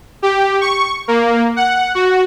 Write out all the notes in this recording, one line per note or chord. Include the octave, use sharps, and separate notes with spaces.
G4
C#6
A#3
F#5
F#4